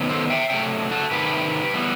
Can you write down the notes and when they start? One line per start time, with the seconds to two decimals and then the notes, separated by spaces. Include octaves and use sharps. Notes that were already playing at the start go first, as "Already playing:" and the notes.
Already playing: C3 D#3 F#3 B3
0.09 A4 C5
0.30 E5 G5
0.50 C3 F#3 A3 E5 G5
0.91 F#4 A4
1.11 C3 D#3 A3 G4 B4
1.74 E3 G3 B3